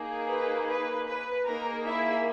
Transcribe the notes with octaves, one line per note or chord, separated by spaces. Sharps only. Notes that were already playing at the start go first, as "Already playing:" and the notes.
Already playing: A#3 D#4 G#4
B4
B4
B4
A#3 D#4 G#4 A#4 A#5
E4 E5